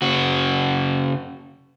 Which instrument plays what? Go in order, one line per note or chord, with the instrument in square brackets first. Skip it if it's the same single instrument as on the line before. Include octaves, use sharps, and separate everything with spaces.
[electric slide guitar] C#3 F#4